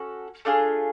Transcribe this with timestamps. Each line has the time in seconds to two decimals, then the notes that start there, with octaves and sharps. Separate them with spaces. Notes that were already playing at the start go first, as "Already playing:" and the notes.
Already playing: C#4 F#4 A4
0.45 A3 D4 F4 G#4